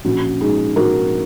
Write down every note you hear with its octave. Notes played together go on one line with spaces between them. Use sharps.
A#1 C#4 F#4
G#2 G#3 D#4 G#4
A#1 F#4 A#4